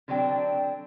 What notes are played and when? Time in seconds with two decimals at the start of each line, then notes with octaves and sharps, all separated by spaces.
0.08 D3 F#3 C4 D4 G5